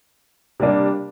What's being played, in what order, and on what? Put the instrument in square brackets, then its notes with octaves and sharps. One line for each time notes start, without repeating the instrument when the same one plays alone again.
[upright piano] C3 G3 A#3 D4